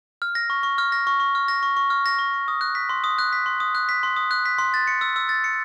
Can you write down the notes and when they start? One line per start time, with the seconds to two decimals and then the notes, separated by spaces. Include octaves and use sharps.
0.22 F6
0.35 A#6
0.50 C#6
0.63 C#6
0.78 F6
0.92 A#6
1.07 C#6
1.20 C#6
1.35 F6
1.48 A#6
1.63 C#6
1.77 C#6
1.90 F6
2.06 A#6
2.19 C#6
2.34 C#6
2.48 D#6
2.61 F#6
2.75 B6
2.89 C6
3.04 D#6
3.18 F#6
3.33 B6
3.46 C6
3.60 D#6
3.75 F#6
3.89 B6
4.03 C6
4.16 D#6
4.31 F#6
4.45 B6
4.58 C6
4.74 A6
4.87 C#7
5.01 E6
5.16 E6
5.29 A6
5.44 C#7